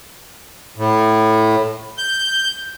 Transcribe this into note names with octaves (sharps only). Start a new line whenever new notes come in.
A2
G6